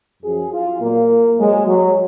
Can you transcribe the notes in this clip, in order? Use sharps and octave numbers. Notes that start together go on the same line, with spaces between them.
F#2 F3 G#4
F4
A#2 F#3 A#3
G#2 F#3 G#3
F#3